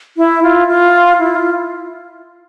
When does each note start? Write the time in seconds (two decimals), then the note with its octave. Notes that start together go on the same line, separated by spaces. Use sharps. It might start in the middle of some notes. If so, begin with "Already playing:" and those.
0.17 E4
0.43 F4
0.68 F4
1.19 E4
1.35 F4